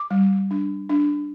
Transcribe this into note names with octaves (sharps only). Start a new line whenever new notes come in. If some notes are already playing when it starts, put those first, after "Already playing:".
Already playing: D6
G3
D4
D4